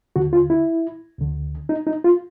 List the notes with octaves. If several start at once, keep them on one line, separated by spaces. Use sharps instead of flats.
D#2 D3 F#4
F4
E4
D2 D3
D#4
D#4
F4